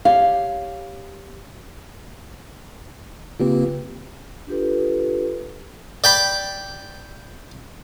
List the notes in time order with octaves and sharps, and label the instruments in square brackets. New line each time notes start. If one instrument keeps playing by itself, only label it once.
[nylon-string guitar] G4 C#5 F5
[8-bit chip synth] C#3 A#3 C4 [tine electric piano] F4 G4 B4
[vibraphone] D4 F4 G4 A4 B4
[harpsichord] D5 G5 B5